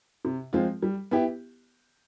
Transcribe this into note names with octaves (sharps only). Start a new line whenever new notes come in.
C3
F3 G#3 C4 F4
G3
B3 E4 G4